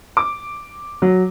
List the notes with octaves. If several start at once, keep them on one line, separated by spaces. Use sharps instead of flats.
D6
F#3